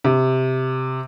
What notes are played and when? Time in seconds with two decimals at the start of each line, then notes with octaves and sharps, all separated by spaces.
0.04 C3